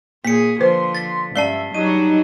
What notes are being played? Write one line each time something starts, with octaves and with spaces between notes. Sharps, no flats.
A#2 A#3 G#4 B6 C#7
D3 F3 B4 C5 C6
A6 B6
G2 G#3 C#4 D5 E5 A5 C7 G7
F#3 G3 D#4 F#4 D#7